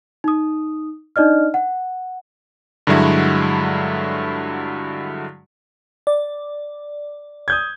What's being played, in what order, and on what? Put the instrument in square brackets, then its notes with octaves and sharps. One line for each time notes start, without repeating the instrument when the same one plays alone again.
[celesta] D#4 D#6
D4 D#4 D5 D#5 F6
F#5
[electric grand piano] G2 D3 F#3 G#3 E4 F#4
[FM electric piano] D5
[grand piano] D#6 G6 G#6